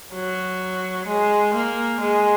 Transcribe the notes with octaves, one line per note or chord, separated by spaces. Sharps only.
F#3
G#3
A#3
G#3